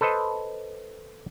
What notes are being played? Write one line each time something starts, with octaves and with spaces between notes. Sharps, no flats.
A4 B4 C5 D#5